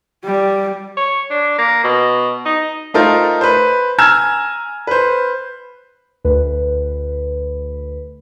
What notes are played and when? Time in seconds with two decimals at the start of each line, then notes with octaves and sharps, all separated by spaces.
0.25 G3
0.97 C#5
1.31 D4
1.58 A#3
1.84 B2
2.46 D#4
2.94 A3 D#4 F4 A4 A#4 C5
3.41 B4 C5
3.98 G#5 A#5 E6 F6 G#6 E7
4.87 B4 C5
6.25 D2 B4